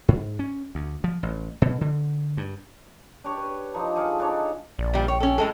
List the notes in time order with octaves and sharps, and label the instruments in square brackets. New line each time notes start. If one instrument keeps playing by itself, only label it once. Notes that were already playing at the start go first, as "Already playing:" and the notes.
[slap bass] G#2
C#4
D2
F3
A1
B2
D3
G2
[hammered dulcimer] D4 G4 C#5 C#6
B4
F3 D4 D#4 A#5
G#4 A4 D5 F5
D4 D#4 C#5
[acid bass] A#1 [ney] D5
[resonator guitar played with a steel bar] A#2 G3
[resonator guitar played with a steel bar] C#5 [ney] G5
[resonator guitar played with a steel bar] C#4 A4
A2 G#3 A4